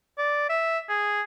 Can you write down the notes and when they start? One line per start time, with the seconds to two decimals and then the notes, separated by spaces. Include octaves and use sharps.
0.18 D5
0.50 E5
0.89 G#4